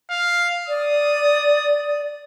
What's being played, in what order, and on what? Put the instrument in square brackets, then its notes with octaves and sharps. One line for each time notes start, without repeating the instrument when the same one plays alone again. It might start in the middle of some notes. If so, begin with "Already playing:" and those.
[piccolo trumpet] F5
[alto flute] D5 [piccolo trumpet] D#6